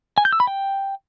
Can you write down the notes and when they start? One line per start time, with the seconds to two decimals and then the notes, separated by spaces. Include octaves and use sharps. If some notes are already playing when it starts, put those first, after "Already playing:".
0.18 G#5
0.25 G6
0.32 E6
0.40 B5
0.47 G5